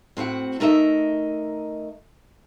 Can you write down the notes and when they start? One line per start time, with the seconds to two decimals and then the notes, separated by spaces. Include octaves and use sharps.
0.17 A2 C4 F#4 F#5
0.60 A3 D#4 A#4 D#5 E5